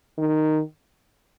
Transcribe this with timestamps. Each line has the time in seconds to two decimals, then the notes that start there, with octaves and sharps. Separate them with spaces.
0.18 D#3